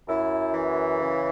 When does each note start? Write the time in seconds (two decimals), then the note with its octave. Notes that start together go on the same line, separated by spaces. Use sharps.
0.08 F#2 E4
0.54 E3
1.00 C#3